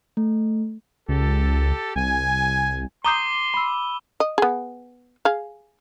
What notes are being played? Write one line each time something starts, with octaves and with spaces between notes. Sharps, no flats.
A3
C#2 G4 A4
C2 G#5
A#5 C6 D6 D#6 G6 D#7 G7
B5 E6
D#5
B3 G#4
G#4 F5